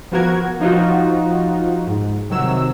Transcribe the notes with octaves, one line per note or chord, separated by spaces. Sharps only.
F3 B3 F#4 A#4 G#6
F3 D#4 F4 F#4
G#2
C3 D#3 F#3 E6